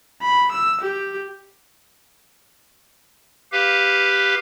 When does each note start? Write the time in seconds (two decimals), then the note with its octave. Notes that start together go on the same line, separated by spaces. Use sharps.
0.22 B5
0.52 E6
0.81 G4
3.52 G4 B4 F5